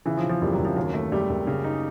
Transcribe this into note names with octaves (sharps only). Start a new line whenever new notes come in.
C#3 E3
F3
C#3
F3
F#1 G3
F#3
F#1
F3
D#2 F#3
A3
F#1 G3
F#1
C#3
D#4